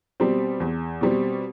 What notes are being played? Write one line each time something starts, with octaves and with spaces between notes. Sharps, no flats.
B2 G3 C4
E2
B2 G3 C4